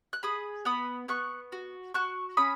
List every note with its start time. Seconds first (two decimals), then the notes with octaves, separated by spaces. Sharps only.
0.13 F#6
0.23 G#4 B5 D#6
0.65 B3 B5 D#6
1.08 B3 C#6 F#6
1.52 F#4
1.94 F#4 C#6 F#6
2.37 C#4 B5 D#6